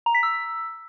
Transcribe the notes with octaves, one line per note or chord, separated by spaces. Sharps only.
A#5
B6
E6